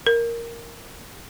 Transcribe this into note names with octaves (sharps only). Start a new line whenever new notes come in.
A#4